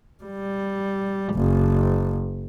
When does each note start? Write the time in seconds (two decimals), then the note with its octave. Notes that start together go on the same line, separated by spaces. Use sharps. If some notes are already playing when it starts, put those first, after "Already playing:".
0.23 G3
1.34 F#1